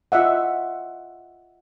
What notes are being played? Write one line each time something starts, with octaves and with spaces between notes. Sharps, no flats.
F4 D#5 E5 F#5